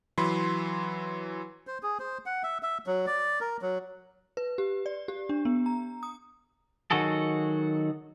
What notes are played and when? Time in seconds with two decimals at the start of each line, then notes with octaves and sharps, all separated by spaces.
0.18 E3 F#3 B5 C6
1.67 C5
1.83 G#4
1.99 C5
2.26 F#5
2.43 E5
2.63 E5
2.87 F#3
3.07 D5
3.41 A#4
3.62 F#3
4.37 B4
4.58 G4
4.86 D5
5.08 G4
5.29 D4
5.45 B3
5.66 A#5
6.03 D#6
6.91 D#3 F#3 F#4 G#4 A4